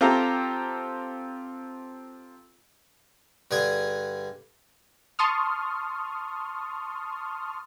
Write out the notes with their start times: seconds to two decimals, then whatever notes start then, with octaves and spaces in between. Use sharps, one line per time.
0.01 C4 F4 G4 A4 A#5
3.51 G2 D3 G#4 G#5
5.19 A5 C6 C#6 D#6 F6